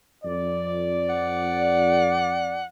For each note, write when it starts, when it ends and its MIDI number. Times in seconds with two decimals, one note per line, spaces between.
0.24 2.64 41
0.24 2.64 74
1.10 2.64 78